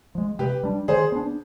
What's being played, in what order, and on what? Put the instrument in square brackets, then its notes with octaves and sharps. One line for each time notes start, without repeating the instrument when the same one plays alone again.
[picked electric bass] F3 G#3
[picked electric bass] C3 [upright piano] G4 B4
[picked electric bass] G3 D4
[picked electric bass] D#3 [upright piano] G#4 C5
[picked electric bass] B3 D4